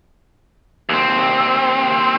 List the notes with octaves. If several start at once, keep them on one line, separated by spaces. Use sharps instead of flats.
D#2 C4